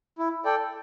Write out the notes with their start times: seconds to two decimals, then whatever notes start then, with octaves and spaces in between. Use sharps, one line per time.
0.18 E4
0.45 A4 D5 G5